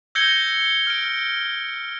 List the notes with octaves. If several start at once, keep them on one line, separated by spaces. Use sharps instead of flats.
E6 G6 G#6 A#6 C#7 G7
F6 D7